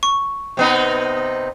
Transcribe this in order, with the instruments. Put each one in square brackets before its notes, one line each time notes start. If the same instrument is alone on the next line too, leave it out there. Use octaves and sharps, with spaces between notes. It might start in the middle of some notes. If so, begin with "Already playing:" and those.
[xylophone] C#6
[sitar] C3 B3 D#4